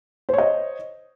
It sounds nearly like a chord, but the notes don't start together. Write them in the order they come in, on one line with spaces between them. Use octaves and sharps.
C5 C#5 D#5